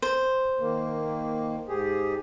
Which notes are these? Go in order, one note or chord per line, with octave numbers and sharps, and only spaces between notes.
C5
D#3 A#3
G#2 G4 G#4